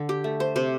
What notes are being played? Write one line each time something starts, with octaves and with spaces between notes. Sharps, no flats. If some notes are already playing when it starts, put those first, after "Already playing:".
Already playing: D3
G4
A3
C5
C3 C5